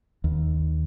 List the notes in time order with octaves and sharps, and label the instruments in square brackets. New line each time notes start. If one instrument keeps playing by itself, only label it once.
[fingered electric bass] D#2